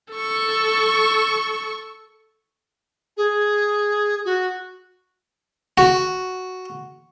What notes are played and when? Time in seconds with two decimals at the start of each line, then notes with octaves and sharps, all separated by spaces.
0.12 A4 C#6
3.16 G#4
4.24 F#4
5.78 F#4